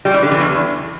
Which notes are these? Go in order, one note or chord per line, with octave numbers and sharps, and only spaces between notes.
G3
E3
D3
E3
E2